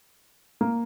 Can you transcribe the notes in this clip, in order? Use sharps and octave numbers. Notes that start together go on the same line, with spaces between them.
A#3